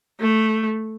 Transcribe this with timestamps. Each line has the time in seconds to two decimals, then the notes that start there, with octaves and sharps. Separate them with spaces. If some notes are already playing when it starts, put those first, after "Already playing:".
0.20 A3